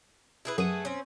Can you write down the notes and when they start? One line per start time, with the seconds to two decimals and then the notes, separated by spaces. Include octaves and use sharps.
0.45 E4 G#4 B4
0.58 F#2 A3 G#4 F#5 D#6
0.85 C4 C#4